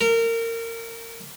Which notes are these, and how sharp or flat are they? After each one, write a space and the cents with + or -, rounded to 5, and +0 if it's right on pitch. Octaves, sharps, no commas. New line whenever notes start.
A#4 -25